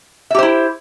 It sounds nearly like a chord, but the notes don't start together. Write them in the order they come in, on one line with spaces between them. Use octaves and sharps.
E5 G4 C5 E4